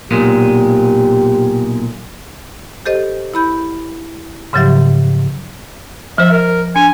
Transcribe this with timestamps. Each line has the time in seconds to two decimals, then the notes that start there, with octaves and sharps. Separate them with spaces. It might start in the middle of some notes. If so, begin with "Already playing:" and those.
0.11 B1 A#2 G#3 G4
2.86 G4 A4 C5 D#5
3.34 E4 B5 G6
4.53 G#2 C#3 F3 F#3 G4 E5
6.18 F3 C5 E5
6.31 A#4
6.76 D4 G#5